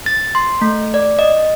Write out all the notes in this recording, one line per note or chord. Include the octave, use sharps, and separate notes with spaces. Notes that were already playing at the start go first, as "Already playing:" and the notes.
A6
C6
A3
D5
D#5